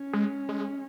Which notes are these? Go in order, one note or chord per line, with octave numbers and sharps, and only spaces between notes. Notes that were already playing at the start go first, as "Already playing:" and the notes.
Already playing: C#4
G#3
G#3